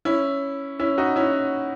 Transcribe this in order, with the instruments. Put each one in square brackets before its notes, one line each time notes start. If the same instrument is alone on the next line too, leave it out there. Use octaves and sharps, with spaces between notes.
[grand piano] C#4 E4
C#4 E4
D#4 F#4
C#4 E4